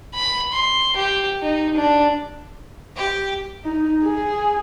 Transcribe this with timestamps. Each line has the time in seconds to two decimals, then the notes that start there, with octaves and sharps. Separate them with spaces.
0.15 B5
0.52 C6
0.96 G4
1.42 D#4
1.76 D4
2.96 G4
3.64 D#4
4.04 G#4